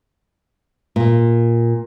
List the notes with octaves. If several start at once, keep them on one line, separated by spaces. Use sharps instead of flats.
A#2